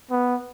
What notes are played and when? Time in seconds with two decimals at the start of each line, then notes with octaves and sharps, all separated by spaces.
0.11 B3